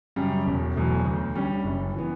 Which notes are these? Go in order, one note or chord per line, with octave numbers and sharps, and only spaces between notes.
F#2 C#3 G3
E1
E2 B2 F#3 A3
D2
D3 G3 C#4
F#1
E3 B3